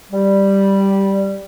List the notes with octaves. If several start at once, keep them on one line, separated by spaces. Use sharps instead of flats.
G3